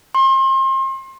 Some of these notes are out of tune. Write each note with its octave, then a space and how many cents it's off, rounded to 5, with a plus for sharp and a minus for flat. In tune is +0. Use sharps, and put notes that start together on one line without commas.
C6 +35